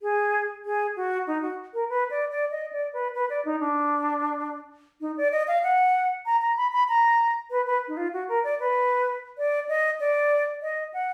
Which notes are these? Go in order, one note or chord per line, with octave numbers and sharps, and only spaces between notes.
G#4
G#4
F#4
D#4
F#4
A#4
B4
D5
D5
D#5
D5
B4
B4
D5
D#4
D4
D#4
D5
D#5
F5
F#5
A#5
A#5
B5
B5
A#5
B4
B4
D#4
F4
F#4
A#4
D5
B4
D5
D#5
D5
D#5
F#5